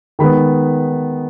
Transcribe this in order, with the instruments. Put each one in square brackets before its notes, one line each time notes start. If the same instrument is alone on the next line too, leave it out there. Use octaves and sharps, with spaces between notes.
[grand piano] D#3 G#3 B3 B5